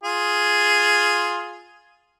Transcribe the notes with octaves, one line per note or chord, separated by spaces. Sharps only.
F4 G#4